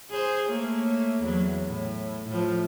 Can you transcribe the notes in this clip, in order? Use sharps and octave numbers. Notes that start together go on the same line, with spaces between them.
G#4 C5
A3 A#3 C#5
E2 F#3
A2
A2 F3